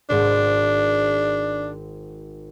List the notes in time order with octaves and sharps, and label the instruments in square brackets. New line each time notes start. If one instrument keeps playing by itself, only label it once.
[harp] G#1 G#2 [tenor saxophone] D4